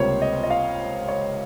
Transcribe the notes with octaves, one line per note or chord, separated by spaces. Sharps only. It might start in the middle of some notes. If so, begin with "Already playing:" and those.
Already playing: C#2 C3 G3 A#3 F4 C5 C#5
D#5
D#5
F5
C#5